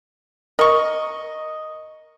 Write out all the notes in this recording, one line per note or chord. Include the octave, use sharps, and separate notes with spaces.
A#4 D#5 C#6